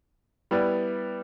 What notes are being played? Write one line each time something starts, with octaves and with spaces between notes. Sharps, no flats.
G3 B3 E4 B4 D5